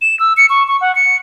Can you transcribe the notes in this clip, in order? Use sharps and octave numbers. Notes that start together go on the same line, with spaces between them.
E7
E6
C#7
C#6
C#6
F#5
C#7